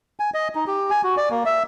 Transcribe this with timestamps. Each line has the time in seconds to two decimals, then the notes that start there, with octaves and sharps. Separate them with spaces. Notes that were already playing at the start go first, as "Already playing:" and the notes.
0.20 G#5
0.34 D#5
0.55 D#4
0.67 G4
0.91 G#5
1.04 F#4
1.17 D5
1.31 A#3
1.45 E5